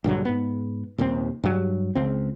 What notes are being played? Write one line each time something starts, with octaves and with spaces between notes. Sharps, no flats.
A#1 G2 D3 F#3
G#2 B3
D#1 D#2 C3 C4
G2 F#3
C#2 C4